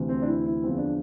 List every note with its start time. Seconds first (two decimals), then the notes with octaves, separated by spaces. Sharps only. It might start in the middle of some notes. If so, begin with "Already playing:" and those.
Already playing: D2 C3 E3
0.09 C4
0.22 D4
0.27 E4
0.46 E4
0.63 E2 D3 F3 C4
0.78 D4